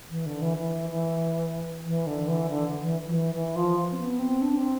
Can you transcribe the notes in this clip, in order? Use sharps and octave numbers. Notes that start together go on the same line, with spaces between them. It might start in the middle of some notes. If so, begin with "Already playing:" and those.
E3
D3
E3
E3
E3
E3
D3
E3
D3
E3
F3
E3
E3
F3
C4
B3
C4
D4
C4